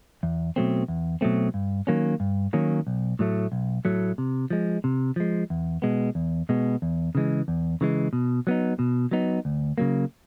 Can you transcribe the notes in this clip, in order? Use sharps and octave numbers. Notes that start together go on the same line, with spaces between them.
E2
B2 F#3 A3 C4
E2
B2 F#3 A3 C4
G2
D#3 F#3 A#3 C#4
G2
D#3 F#3 A#3 C#4
B1
A2 F#3 A3
B1
A2 F#3 A3
C3
F3 G#3
C3
F3 G#3
E2
B2 G#3 B3
E2
B2 G#3 B3
E2
C#3 E3 G#3
E2
C#3 E3 G#3
B2
F#3 B3 D#4
B2
F#3 B3 D#4
D2
C#3 F#3 A#3